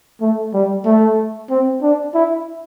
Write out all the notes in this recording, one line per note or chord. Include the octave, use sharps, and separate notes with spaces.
A3
G3
A3
C4
D4
E4